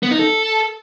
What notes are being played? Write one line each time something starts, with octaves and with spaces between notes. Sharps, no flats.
B3
D#4
A4